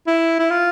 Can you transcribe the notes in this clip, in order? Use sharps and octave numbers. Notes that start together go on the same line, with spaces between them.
E4
E4
F4